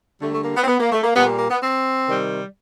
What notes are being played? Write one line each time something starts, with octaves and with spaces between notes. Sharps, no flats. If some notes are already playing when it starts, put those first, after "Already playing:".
D3 G3 A3
A3
A#3
B3
C4
B3
A#3
A3
A#3
A#2 G3 B3
A#3
A#3
B3
C4
C3 D#3 G3